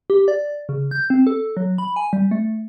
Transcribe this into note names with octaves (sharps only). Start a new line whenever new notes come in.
G4
D5
C#3
G6
C4
A4
F#3
B5
G#5
G3
A3